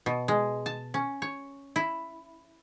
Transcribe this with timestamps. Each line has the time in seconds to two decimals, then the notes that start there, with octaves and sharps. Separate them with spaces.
0.06 B2
0.28 G#3
0.66 A5
0.94 C#4
1.22 C#5
1.76 E4